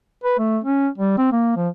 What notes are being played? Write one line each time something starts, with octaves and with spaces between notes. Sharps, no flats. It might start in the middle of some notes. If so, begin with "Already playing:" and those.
B4
A3
C#4
G3
C4
A#3
F3